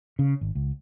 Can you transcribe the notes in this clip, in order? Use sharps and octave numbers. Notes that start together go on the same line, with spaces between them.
C#3
G#1
C#2